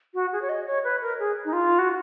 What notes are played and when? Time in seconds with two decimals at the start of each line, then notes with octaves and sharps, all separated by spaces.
0.14 F#4
0.33 G#4
0.42 C#5
0.49 D#5
0.67 C#5
0.84 B4
1.02 A#4
1.19 G#4
1.45 D#4
1.53 F4
1.79 F#4